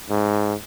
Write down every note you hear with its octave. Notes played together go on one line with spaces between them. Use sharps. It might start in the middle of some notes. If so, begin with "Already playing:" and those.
G#2